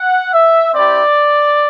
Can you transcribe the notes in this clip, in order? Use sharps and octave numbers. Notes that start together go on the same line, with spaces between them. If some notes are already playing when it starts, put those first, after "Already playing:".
Already playing: F#5
E5
C4 E4 G4 D5